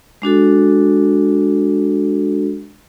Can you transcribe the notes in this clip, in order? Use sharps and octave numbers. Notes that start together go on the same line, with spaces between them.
G#3 D4 F#4 A4